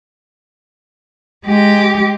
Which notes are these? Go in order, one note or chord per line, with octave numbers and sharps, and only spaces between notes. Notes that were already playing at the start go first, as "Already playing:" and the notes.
G#3 G4